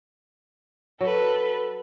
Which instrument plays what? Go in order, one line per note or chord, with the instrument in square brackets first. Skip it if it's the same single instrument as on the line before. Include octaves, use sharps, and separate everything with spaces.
[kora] F#3 [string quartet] A4 B4